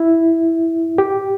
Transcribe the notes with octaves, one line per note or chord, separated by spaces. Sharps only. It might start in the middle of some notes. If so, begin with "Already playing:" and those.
Already playing: E4
G4